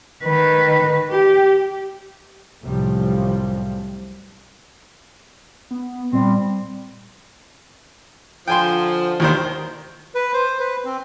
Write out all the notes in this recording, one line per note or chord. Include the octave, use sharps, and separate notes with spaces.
D#3 B4
G4
C2 F#2 A2 C3 F3 G3
B3
A#2 G3 C4
D3 F3 G5 G#5 C6
D#2 D#3 C5
B4
C5
B4
C4